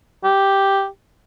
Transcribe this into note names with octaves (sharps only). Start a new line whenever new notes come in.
G4